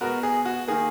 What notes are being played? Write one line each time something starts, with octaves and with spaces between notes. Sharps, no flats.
B2 G#3 B3 F#4 A#4
G#4
F#4
D#3 A#3 G#4